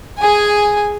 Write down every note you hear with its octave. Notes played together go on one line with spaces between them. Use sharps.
G#4 G#5